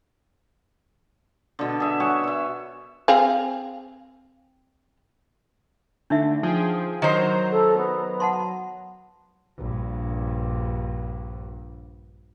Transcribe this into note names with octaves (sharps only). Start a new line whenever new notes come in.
B2 D3
G#4 E5
C#5 E5 F#5 G#5
C#5 E5
C4 G#4 F5
D3 A3 D4 D#4 E5
F3 G#4 G5
D#3 F#3 C5 A#5
A4
B3
F#5 A5 C6
A#1 G2